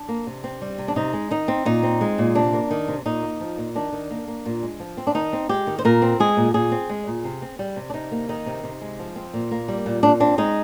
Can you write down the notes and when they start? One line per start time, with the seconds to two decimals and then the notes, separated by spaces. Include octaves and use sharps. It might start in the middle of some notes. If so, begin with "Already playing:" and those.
Already playing: D4
0.09 A#3
0.27 C3
0.44 C4
0.61 G3
0.78 C3
0.88 D4
0.96 C3 D#4
1.13 G#3
1.31 D#3 D#4
1.48 C4
1.65 A#2 D#4
1.83 C4
2.01 G#3
2.18 A#2
2.35 C3 D4
2.53 A#3
2.71 D#3
2.88 C3
3.06 A#2 D#4
3.23 A#3
3.40 F3
3.58 A#2
3.75 D#3 D4
3.92 D#3
4.10 A#3
4.28 A#3
4.46 A#2
4.63 G#3
4.80 F3
4.97 C4
5.07 D4
5.15 D#3 D#4
5.33 C4
5.49 G#3 G4
5.67 D#3
5.79 C5
5.85 A#2 A#4
6.02 C4
6.20 G#3 G#4
6.37 A#2
6.54 A#2 G#4
6.71 C4
6.90 G#3
7.07 A#2
7.24 C3
7.42 C4
7.59 G3
7.76 C3
7.90 D4
7.94 C3 D#4
8.12 A#3
8.29 D#3 D#4
8.46 C3
8.63 C3
8.81 G#3
8.99 F3
9.16 C4
9.34 A#2
9.51 A#3
9.68 G3
9.86 A#2
10.03 A#2 D4
10.20 C4 D4
10.38 G#3 D#4